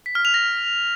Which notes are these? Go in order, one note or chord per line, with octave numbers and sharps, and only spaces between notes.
B6
F6
F7
A#6